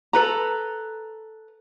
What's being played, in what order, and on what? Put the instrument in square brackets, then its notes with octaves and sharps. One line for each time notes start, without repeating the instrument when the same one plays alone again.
[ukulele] A4 B4 A#5